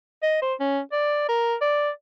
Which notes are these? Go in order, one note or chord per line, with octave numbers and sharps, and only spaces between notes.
D#5
C5
C#4
D5
A#4
D5